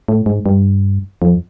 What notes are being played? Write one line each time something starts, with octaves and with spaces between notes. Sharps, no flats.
A2
G#2
G2
F2